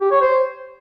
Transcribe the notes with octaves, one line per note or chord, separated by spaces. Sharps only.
G4
C#5
C5